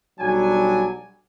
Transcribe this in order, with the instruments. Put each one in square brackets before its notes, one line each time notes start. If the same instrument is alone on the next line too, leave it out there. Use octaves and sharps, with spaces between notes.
[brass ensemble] B1 F#3 G3 D4 G#5